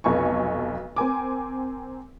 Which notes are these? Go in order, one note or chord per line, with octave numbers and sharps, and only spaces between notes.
F1 B1 A4 G#5 C#6
C4 A#4 G#5 D6